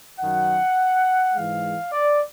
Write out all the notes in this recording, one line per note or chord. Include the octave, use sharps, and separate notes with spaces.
F#2 D#3 F#3 F#5
G#2 E3 G#3 F5
D5